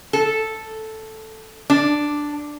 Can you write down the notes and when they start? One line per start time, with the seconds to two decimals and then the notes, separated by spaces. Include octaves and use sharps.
0.13 A4
1.70 D4